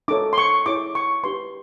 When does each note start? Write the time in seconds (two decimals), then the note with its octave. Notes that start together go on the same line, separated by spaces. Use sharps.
0.08 D#4 F#4 A4 C#5 D6
0.33 C6
0.38 C#6
0.66 E4 G#4 C#5 D6
0.95 C#6
1.23 D#4 G4 B4 C6